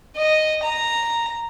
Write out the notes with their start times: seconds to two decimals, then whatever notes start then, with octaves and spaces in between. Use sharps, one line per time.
0.17 D#5
0.63 A#5